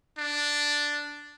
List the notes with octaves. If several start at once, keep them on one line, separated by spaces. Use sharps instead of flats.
D4